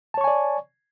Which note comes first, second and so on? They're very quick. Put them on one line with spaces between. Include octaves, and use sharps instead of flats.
A5 C#5 C#6 G#5 D5